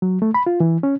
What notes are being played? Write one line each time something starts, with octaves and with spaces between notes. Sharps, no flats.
F#3
A3
B5
F4
E3
C#4